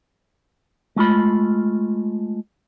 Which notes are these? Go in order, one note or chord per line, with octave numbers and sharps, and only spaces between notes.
G#3 A3 F4 B5